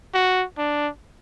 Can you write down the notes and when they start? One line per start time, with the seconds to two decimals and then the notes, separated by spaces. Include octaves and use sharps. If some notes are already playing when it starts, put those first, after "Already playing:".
0.14 F#4
0.58 D4